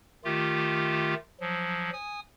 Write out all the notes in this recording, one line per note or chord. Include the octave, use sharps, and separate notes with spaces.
D#3 A3 F4 G4
F3 F#3
G#5 D#6